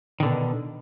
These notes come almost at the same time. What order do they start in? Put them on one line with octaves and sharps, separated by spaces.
D#3 D3 B2